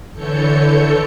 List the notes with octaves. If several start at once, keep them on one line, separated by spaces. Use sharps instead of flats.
D3 E3 A4 C#5 G6 C#7